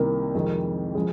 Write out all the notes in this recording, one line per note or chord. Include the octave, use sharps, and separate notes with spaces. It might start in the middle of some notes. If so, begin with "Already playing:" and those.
Already playing: C2 C3 D#3 A#3
F2 C3 D#3 G#3
F3 G#3